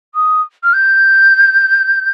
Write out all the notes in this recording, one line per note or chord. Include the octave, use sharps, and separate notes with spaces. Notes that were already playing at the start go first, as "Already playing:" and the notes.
D#6
F6
G6